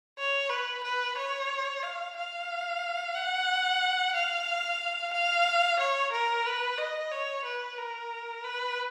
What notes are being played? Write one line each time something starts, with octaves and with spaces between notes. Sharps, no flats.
C#5
B4
B4
C#5
F5
F5
F#5
F5
F5
C#5
A#4
B4
D#5
C#5
B4
A#4
B4